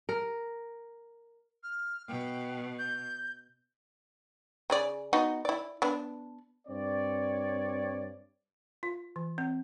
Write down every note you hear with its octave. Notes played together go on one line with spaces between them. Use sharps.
A#4
F6
B2 G5
G6
C#3 G#4 D5
B3 D#4 F#4
E4 D5
B3 D4
G2 C4 C#5 D5
F4
E3
C4